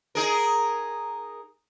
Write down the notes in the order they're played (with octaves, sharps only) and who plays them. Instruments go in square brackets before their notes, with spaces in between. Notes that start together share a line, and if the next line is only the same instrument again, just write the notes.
[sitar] D#4 G#4 A#4